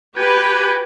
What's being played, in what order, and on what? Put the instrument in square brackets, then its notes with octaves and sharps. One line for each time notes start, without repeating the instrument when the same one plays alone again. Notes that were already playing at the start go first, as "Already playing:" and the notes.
[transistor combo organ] F#4 G5 G#5 [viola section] G4 B4